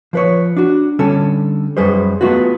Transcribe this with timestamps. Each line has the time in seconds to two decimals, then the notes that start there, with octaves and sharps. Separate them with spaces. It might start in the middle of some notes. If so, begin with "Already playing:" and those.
0.13 F3 B4 C#5
0.57 D4 F#4
0.99 D3 G3 C#4 A4
1.77 F#2 G3 G#4 B4 C5
2.21 G#3 A3 B3 F4 F#4